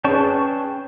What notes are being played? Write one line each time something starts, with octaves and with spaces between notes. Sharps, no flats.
C#4 G#4 B4 G5 A5 C#6